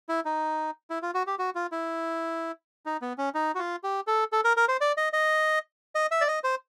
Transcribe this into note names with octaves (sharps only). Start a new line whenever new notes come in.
E4
D#4
E4
F4
F#4
G4
F#4
F4
E4
D#4
B3
C#4
D#4
F#4
F4
G4
A4
A4
A#4
A#4
C5
D5
D#5
D#5
D#5
E5
D5
D#5
C5